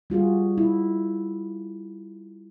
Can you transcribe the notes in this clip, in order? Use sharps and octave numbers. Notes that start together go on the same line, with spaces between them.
G3 F4 F#4 G#4
E4